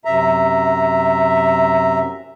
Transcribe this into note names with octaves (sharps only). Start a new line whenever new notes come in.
F#2 C3 E5 A#5